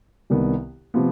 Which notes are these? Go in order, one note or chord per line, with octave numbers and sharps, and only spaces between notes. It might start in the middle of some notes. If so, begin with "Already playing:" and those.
C2 C3 D#3 B3
C3 F3 B3